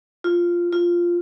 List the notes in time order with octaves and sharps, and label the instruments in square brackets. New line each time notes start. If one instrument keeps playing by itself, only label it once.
[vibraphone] F4
F4